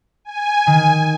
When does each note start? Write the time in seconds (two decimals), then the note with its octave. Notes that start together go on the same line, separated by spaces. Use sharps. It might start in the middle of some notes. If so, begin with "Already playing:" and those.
0.25 G#5
0.67 D#3